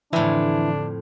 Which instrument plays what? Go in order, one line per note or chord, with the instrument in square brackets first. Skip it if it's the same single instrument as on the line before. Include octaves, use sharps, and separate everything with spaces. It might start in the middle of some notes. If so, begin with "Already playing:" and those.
[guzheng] F2 A2 [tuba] D3 [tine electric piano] E3 E4 [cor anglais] D4